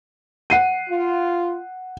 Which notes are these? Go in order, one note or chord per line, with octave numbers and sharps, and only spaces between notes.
F#5 C7 D#7
F4